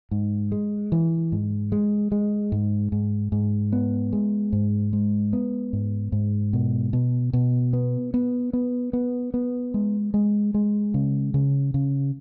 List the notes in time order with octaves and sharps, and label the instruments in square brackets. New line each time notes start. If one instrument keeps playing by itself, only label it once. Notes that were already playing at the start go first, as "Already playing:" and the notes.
[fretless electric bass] G#2
G#3
E3
G#2
G#3
G#3
G#2
G#2
G#2
B3
G#3
G#2
G#3
B3
G#2
G#2
B2
B2
B2
B3
B3
B3
B3
B3
G#3
G#3
G#3
C#3
C#3
C#3